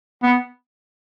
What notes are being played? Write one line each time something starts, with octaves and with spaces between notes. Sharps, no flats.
B3